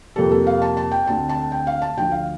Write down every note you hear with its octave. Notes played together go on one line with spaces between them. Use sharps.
F2 C3 G3 A#3 A4
A4
F5
A5
A5
G5
D2 D3 A3 C4 A5
A5
G5
F5
A5
D2 D3 F3 G5
F5